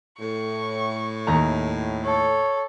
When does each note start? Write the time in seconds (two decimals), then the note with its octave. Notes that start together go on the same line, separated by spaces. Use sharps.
0.19 A2 C#6
1.27 D#2 A#5
2.05 A4 C#5